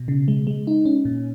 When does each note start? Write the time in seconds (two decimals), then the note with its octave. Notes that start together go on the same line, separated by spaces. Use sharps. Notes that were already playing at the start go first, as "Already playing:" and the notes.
Already playing: B2
0.08 C#3
0.28 G#3
0.47 G#3
0.67 D#4
0.85 C#4
1.05 A#2